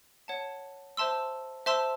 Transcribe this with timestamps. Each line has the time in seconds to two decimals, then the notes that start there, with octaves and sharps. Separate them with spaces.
0.28 C#5 F#5 A5
0.97 C5 E5 A5 C6 E6
1.66 C5 E5 A5 C6 E6